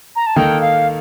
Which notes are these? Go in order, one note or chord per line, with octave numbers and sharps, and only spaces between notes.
A#5
A5
D#3 A#3 D#4 A4 G5
F5